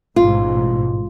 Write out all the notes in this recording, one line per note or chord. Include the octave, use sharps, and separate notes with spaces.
A1 G#2 B2 F4